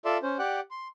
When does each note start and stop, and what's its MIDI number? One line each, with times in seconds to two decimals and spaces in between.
0.05 0.18 65
0.05 0.18 69
0.05 0.18 74
0.05 0.18 76
0.05 0.18 84
0.23 0.37 61
0.23 0.37 72
0.39 0.60 67
0.39 0.60 74
0.39 0.60 78
0.39 0.60 79
0.39 0.60 90
0.71 0.88 84